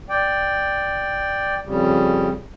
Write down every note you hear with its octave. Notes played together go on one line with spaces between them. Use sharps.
D5 G5
F2 C#3 G3